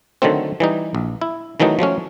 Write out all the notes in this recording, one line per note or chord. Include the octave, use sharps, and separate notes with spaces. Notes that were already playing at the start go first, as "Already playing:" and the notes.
D3 D#3 F#3 A3 C4
E3 G3 D#4
A#1
E4
D#3 E3 F#3 A3 D#4
F3 F#3 A3 C#4